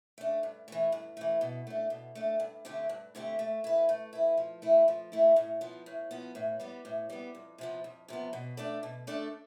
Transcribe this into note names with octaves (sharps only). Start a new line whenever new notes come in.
A3 D4
G2
E3 A3
G2
E3 A3
B2
A3 D4
B2
A3 D4
G2
D3 A3 C4 G4
G2
D3 A3 C4 G4
A3
E4 B4
A3
E4 B4
F3
A3 E4
F3
A3 E4
A2
F3 B3
A2
F3 B3
A2
G3 B3
A2
G3 B3
F2
C3 F3 B3
F2
C3 F3 B3
B2
A3 D4 A4 D5
B2
A3 D4 A4 D5